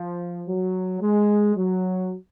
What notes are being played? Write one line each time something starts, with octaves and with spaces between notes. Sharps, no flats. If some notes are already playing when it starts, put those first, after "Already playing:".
Already playing: F3
F#3
G#3
F#3